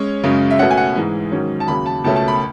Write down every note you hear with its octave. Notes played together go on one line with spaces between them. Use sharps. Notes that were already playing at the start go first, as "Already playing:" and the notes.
Already playing: G#3 C#4 C#5
F#2 C#3 G#3
E5
B2 A3 C#4 F#5
G#5
F#5
G#2 E3 G#3
G#2 D#3 F#3 C#4
A5
D#2 C#3 F#3 B5
A5
C#2 B2 A3 C#4 A5
A5
B5